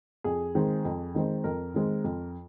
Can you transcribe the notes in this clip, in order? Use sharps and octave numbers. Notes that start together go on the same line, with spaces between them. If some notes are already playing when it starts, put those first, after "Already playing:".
F2 G#4
D#3 G#3 C4
F2
D#3 G#3 C4
F2 A#4
D#3 G#3 C4
F2